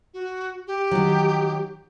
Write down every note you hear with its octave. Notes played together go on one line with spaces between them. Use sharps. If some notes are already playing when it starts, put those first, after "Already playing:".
F#4
G4
D#3 F#3